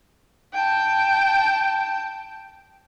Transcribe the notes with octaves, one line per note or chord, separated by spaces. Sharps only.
G5 A5